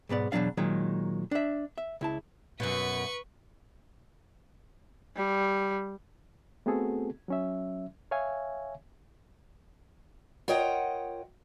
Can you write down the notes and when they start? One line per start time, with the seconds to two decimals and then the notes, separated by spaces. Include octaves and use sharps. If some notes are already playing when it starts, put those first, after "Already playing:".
0.09 B1 G#2 B3 D5
0.32 E2 B2 E3 F#3 D4 F5
0.58 A#2 D#3 F#3 G#3
1.31 D4 E5
1.78 E5
2.01 C#2 E4 A5
2.60 F#2 B2 B4 C#6
5.16 G3
6.66 A3 B3 C4 F#4 G#4 A4
7.28 F#3 C#4 E5
8.11 C#5 E5 F5 G#5
10.48 F4 A#4 C#5 D#5 F#5 G5